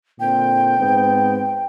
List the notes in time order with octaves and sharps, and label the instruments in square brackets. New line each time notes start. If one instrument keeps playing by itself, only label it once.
[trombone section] A#2 D3 C4 [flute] G5
[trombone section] G#2 B3 C4